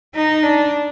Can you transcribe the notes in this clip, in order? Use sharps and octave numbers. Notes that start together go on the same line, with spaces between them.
D#4
D4